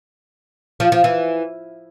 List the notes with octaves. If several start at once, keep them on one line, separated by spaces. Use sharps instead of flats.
F3
F3
E3